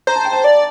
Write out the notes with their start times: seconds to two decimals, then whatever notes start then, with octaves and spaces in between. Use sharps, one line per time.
0.07 C5 A#5
0.16 A5
0.25 G5
0.33 A5
0.44 D5